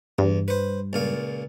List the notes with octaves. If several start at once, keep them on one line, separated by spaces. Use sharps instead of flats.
E2 G2
B4 C5
C#2 A#2 F5